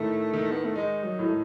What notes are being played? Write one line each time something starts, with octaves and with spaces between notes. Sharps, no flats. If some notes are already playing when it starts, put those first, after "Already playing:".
Already playing: A2 D#3 A3
D#3
B3
A3
G#3 D#4
F#3
A2
A3